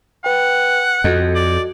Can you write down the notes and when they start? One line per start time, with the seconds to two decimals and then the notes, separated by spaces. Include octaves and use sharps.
0.24 B4 F#5 G5
1.04 F2 F#4 A4 D#5
1.35 D5